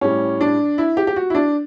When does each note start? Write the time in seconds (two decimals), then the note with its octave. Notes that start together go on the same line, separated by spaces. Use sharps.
0.01 A2 G3 C#4
0.41 D4
0.78 E4
0.97 G4
1.07 G4
1.16 F#4
1.30 E4
1.35 D4